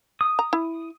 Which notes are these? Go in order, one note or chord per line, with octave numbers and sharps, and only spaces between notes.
D#6
A#5
E4